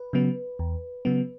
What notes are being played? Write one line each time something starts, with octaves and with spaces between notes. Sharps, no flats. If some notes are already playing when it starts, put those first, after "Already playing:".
Already playing: B4
C#3 F#3 B3
E2
C#3 F#3 B3